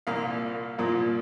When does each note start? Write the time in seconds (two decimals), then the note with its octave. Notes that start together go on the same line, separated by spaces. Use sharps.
0.07 C2 A#2 F3 A#3 F5
0.78 C2 A#2 F3 A#3